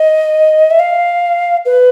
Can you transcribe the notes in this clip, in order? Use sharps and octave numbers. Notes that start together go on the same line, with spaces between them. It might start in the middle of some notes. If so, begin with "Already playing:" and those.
Already playing: D#5
E5
F5
B4